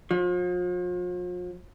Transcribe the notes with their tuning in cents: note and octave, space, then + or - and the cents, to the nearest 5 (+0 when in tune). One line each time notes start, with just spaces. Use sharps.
F3 +40